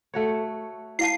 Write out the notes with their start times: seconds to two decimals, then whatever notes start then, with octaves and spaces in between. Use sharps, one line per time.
0.14 A3 F#4 C#5
0.99 E4 F5 A5 C7